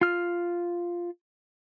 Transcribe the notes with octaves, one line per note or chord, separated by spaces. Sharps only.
F4 F6